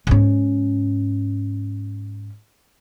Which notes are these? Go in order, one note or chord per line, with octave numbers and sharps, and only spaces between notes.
G#2 C#4